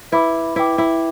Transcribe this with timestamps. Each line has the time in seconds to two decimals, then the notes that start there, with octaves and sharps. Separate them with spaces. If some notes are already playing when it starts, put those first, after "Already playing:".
0.12 E4 B4 E5 B5 D6
0.56 E4 B4 E5 G5 D6
0.78 E4